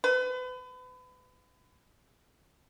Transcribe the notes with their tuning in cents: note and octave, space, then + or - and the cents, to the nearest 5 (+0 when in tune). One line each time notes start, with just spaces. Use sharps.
B4 +35